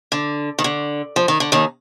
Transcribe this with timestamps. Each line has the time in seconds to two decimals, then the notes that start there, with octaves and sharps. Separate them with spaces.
0.12 D3
0.59 D#3
0.64 D3
1.16 F3
1.28 D#3
1.40 D3
1.52 D#2 D#3